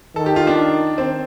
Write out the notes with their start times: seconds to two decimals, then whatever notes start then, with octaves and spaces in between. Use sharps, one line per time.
0.16 D#3 A4
0.26 G4
0.36 F4
0.47 D4
0.98 C4